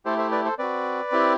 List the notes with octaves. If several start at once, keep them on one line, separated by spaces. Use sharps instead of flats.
A3 E4 G4 A4 C5
C5 E5
B4 D5
A4 C5
C4 F#4 B4 D5
C4 E4 G4